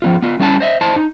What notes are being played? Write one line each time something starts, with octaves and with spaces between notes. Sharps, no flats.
F3 B3 F4
B3 F4
G3 C#4 E4 F5 A5
C5 D#5 E5
E4 C5 D#5 A5
D#4